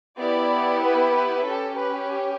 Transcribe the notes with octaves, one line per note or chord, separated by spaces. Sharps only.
B3 E4 G4 D5
B4
B4
C#4 G4 A4
B4